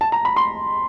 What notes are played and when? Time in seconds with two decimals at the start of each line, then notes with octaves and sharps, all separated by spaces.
0.01 A5
0.12 A#5
0.25 B5
0.36 C6